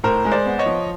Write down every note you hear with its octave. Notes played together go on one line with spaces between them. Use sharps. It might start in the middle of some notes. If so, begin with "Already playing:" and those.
A2 A#4 C5
G#3
C5 D5
B3
C#5 D#5
F3